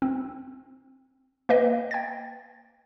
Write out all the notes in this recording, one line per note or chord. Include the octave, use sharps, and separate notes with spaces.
C4
A#3 B4 D#5 G5
G5 G#6 A6